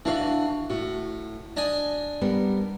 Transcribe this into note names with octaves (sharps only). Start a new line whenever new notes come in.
E3 D4 F#4 F5
A2 F#4
D4 D#5 G#5
G3 B3 A#4